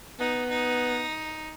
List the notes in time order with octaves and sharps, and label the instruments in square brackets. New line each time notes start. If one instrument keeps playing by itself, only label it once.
[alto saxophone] B3 [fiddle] D#4
[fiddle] D#4